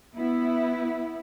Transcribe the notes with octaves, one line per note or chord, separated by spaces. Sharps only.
B3 E4